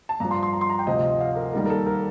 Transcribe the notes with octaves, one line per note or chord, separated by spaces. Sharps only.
A5
G2 F3 A#5
C6
C6
A#5
C6
A#5
G5
D2 C3 F3 D#5
D#5
F5
A#4
D#2 D#3 G3 A#4
A#4
A4
A#4